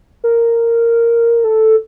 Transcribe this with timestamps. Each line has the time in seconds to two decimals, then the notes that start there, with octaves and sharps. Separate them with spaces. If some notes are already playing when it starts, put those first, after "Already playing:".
0.24 A#4
1.44 A4